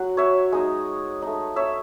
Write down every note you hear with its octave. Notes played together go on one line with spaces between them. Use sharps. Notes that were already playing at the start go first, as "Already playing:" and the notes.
Already playing: F#3 F#5
C#5 E5
G#3 D#4
A3 D#4
C#5 E5